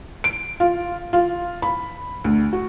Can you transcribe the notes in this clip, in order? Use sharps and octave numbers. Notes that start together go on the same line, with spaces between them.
D7
F4
F4
B5
D2
F#4